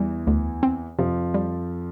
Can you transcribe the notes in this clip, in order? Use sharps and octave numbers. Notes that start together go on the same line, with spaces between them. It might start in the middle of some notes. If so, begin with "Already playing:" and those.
Already playing: E2 E3 G3
D2
C4
F2 C3 F3
G3